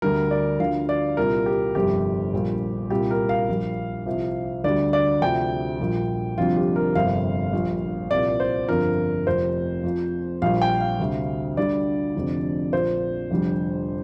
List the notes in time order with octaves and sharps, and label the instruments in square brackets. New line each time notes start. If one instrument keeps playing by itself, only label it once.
[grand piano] D2 D3 G3 A#4
D5
D2 D3 F3 F5
D5
C2 A#2 G3 A#4
G4
G1 F2 C3 G3 G4
A#1 A#2 G3
C2 A#2 G3 G4
A#4
F5
A#1 A#2 G3
C2 C3 F3
D2 D3 G3 D5
D5
D2 C3 F3 G5
A#1 A#2 G3
F1 F2 D3 G3 F4
G4
A#4
G1 F2 C3 G3 F5
A#1 A#2 G3
C2 A#2 F3 D5
C5
G1 F2 D3 F3 A#4
F1 F2 F3 C5
F2 F3
A#1 A#2 G3 F5
G5
F5
D2 C3 G3
D2 D3 G3 D5
F1 F2 D3
A#1 A#2 F3 C5
F1 F2 D3 G3